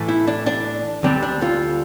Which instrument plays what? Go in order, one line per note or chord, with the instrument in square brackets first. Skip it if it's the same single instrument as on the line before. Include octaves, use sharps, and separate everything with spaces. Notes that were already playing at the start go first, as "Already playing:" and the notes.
Already playing: [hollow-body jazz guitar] A2 E3 A3
E4
D4
D4
D2 D3 G3 C4 D4
D4
F4 A4